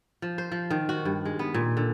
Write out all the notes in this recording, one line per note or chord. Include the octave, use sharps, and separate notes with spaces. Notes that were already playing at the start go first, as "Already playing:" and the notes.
F3
C5
F3
D#3
F#4
G2
G#3
B3
A#2
D3